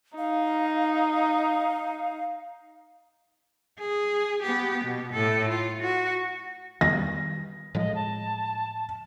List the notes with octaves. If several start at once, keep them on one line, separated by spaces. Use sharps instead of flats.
D#4 F5
G#4
B3 G4
B2
A2 A4
F4
F#4
D#3 G3 B3 A#6
A2 F3 G#3 D#5
A5